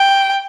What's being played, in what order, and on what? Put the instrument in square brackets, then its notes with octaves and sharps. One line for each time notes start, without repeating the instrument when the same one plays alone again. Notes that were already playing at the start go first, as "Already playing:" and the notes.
Already playing: [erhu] G5